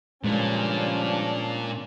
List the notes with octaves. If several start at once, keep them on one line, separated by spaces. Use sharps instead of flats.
G2 A#2 C#3 F3 G#3 C#4 D4